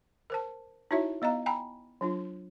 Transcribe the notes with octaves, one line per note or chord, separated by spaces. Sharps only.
A#4 C5 A5
D#4 E4 F#4 C#5 E5
B3 D#5 F5 A#5
G5 G#5 A#5 B5
F#3 D4 F4